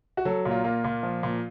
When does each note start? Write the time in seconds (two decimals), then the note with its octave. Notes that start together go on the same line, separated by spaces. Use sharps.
0.17 F#4
0.25 F#3 A4
0.45 A#2
0.51 F4
0.64 A#3 F4
0.84 A#2
1.03 F3
1.23 A#2